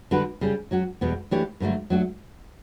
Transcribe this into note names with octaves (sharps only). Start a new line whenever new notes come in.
D3 G3 D4 F#4 B4
C#3 G3 C#4
F#3 C#4 F#4
E2 B2 G3 B3
E3 A3 D4 G4 C#5
G2 D3 F#3 A3
F#3 A3 D4 F#4